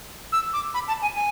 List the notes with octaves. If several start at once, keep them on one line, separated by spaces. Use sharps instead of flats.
E6
D6
B5
A5
G#5
G#5